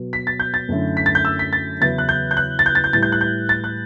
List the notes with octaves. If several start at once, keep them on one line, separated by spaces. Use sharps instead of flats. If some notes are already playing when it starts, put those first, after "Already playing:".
Already playing: B2 F#3 B3
B6
A6
G6
A6
F#2 D3 A3 C#4 E4
B6
A6
G6
E6
B6
A6
E2 C#3 F#3 B3 E4 A6
F#6
G6
G6
F#6
A6
G6
A6
G6
A2 E3 G3 A6
G6
F#6
G6
A6
F#6